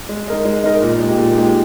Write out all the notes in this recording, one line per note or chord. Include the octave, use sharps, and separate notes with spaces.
G#3
D#4 A#4 D#5
G#3
D#4 A#4 D#5
A#2
G#3 D#4 G4
A#2
G#3 D#4 G4